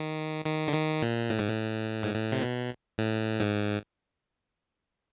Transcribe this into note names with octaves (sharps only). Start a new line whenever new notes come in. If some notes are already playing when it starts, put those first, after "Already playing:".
Already playing: D#3
D#3
D3
D#3
A#2
A2
G#2
A2
G#2
A2
C3
B2
A2
G#2